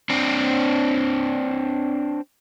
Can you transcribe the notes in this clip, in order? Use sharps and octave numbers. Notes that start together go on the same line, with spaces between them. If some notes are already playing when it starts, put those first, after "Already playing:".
C4 D4